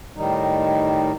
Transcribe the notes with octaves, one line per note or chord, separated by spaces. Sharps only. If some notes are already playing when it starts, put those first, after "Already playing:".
A2 D#3 G3 D#4